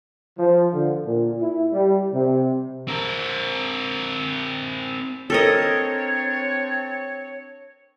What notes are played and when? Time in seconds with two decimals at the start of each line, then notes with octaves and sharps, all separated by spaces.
0.39 F3
0.74 D3
1.07 A#2
1.41 E4
1.73 G3
2.14 C3
2.88 C4 A#4
5.30 C4 D4 A4 A#4 C#5 D#5